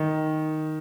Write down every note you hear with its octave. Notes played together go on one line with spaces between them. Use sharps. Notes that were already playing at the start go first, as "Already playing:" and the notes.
Already playing: D#3